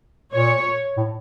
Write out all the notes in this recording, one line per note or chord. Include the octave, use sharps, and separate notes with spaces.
A#2 C#5
A2